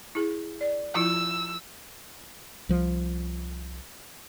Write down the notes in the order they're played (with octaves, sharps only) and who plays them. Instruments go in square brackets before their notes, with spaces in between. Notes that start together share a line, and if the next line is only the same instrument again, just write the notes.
[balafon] E4 G#4
D5
[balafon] F3 E4 F4 [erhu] E6
[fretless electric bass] C2 F3